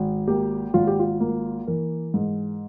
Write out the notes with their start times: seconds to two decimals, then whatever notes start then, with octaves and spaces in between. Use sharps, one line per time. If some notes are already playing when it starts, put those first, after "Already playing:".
Already playing: G#1
0.27 A#3 G4
0.74 G#1 F4
0.87 G4
0.99 F4
1.20 A#3
1.67 E3 A#4
2.14 G#2